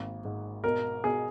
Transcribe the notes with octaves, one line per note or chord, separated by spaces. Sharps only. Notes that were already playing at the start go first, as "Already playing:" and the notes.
Already playing: G#1 A#3
G#2
B2 A#4
B2 G#4